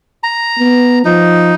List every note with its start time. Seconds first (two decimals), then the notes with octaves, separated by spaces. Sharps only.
0.23 A#5
0.59 B3
1.05 F3 D#4